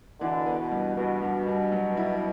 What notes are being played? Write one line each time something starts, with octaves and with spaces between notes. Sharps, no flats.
B2 D3 E3
B3
B2
G2
G2 B2
G2
G2
F#3
E4